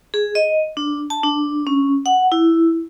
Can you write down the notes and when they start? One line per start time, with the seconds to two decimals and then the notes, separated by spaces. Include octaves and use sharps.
0.14 G#4
0.35 D#5
0.77 D4
1.10 A5
1.23 D4
1.67 C#4
2.06 F#5
2.32 E4